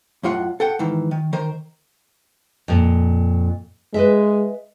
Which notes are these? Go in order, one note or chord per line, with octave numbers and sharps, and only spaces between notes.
F#2 A2 F4 F#5
A4 F#5 G5
G#2 D#3 E3
D#3
D#3 A#4 C5
F2 A#2
G#3 B4 D#5 E5